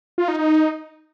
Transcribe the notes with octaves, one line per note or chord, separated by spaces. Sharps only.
F4
D#4
D#4